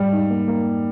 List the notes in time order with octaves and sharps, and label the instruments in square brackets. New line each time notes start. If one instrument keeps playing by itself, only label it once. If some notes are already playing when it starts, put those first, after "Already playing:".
Already playing: [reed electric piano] G#2 [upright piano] G3
[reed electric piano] D#4
A#3
A#3